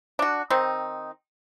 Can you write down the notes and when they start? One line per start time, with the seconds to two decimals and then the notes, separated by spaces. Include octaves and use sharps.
0.19 D4 F#4
0.50 D#3 C4 D#4